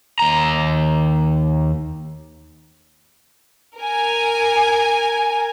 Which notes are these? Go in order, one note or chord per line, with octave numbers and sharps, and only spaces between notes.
D#2 A#5
A#4 G#5